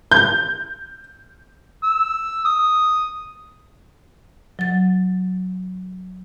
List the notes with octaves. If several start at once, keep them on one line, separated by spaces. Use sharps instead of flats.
G6
E6
D#6
F#3 A6